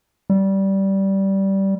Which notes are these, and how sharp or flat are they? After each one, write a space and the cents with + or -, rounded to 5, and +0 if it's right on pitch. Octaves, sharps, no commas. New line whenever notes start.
G3 -15